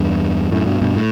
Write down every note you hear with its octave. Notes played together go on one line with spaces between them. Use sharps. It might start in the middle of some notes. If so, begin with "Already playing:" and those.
Already playing: E2 G2
F#2 A2
G2 B2
G2 B2
A2